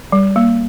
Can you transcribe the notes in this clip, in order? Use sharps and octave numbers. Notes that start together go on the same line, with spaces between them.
G3
A#3